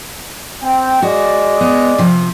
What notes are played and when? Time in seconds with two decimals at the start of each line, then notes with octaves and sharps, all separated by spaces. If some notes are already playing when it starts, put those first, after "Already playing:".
0.63 C4 G5
1.02 G#3 F#4 D5 D#5
1.61 B3
1.98 C3 F3